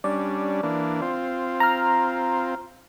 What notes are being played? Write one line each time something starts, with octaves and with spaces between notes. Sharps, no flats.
G3 C#4 D4 D5
E3 A#3 D4
C4 F4
A#5 F6